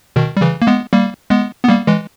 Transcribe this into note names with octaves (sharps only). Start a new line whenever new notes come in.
B2 D#3
G3
C#3 E3
A#3
G#3 B3
G3 A#3
G#3 B3
B3
G3 A#3
E3 G#3